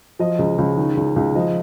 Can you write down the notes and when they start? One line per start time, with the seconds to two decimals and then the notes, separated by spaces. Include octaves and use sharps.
0.19 F3 D#5
0.39 C#2
0.58 C#2
0.77 D#3
0.97 C#2
1.16 C#2
1.35 F3 D#5